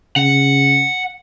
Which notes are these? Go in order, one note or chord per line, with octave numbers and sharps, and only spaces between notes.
C#3 F#5